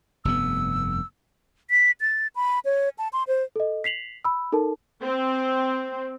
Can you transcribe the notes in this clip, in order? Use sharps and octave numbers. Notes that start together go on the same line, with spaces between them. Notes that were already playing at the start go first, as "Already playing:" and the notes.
F1 G2 B3 E6
B6
A6
B5
C#5
A5
C6
C5
A4 D#5
B6 C7 F7 F#7
B5 E6
D#4 A4 A#4 A5
C4